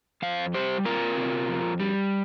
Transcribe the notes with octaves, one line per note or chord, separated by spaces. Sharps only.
F2 C5 F5
G3 G4 C5
C4 F4 A#4
C3
F2
G3